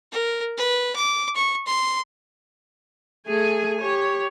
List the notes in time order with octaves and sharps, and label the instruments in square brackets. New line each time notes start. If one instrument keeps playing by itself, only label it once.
[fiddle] A#4
B4
D6
C#6
C6
[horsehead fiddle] A3 [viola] G#4 G#5
[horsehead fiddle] G4 [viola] C#5